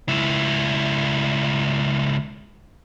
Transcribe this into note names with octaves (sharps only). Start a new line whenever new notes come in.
C#2 E4